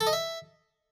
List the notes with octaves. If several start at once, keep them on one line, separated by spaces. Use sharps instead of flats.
A4
D#5
E5